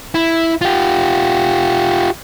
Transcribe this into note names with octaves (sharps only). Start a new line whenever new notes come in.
E4
F4 G4